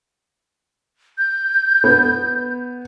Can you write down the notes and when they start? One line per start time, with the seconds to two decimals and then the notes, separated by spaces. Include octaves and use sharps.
1.18 G6
1.84 B3